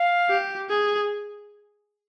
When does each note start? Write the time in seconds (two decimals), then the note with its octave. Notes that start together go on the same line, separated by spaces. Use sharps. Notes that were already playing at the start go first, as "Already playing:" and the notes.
Already playing: F5
0.29 G4
0.70 G#4